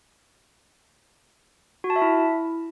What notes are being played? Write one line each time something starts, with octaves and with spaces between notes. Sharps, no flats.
F#4
A5
E5
E4